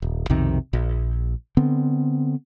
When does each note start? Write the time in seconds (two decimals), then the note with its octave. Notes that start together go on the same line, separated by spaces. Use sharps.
0.02 D#1
0.30 B1 F2 C3 D#3
0.73 A#1
1.57 D3 B3 C4